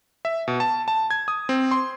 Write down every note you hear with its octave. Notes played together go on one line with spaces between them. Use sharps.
E5
B2
A5
A5
G#6
D#6
C4
C6